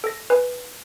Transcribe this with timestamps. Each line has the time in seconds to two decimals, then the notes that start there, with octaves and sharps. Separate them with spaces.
0.04 A4 A#6
0.30 B4 G#5